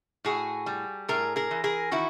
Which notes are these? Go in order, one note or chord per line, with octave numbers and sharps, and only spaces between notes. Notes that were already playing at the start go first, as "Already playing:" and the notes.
A2 F#4 G#4
G3
A2 G#4 A#4
G#4 A#4
E3
G#4 A#4
D#3 E4 F#4